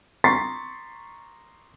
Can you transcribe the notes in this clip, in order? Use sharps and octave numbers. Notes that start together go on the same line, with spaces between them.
A#5 C6 C#6 A6 B6 C7